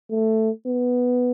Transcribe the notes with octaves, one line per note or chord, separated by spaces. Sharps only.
A3
B3